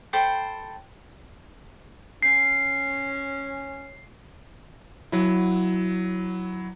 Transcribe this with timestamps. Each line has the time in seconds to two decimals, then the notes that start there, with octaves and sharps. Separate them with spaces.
0.13 A4 C5 G5 B5
2.23 C#4 C7
5.12 F#3 E4